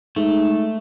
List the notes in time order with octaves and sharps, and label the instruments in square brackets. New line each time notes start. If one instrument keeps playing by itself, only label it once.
[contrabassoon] G#2 [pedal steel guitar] A3